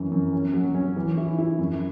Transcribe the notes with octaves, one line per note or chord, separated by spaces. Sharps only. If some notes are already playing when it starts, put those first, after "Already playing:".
Already playing: F#2 E3
F#2
C#4
F#3
C#4
E3
E4
E4
F#2